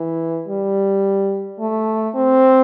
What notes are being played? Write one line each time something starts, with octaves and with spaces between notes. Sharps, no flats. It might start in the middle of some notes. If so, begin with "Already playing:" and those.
Already playing: E3
G3
A3
C4